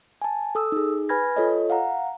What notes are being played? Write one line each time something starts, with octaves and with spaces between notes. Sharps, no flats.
G#5 A5
A4 D#6 E6
D#4 G#4
B4 G#5 B5 F6 G#6 A#6
F4 A4 C#5 D#5
F5 F#5 A#5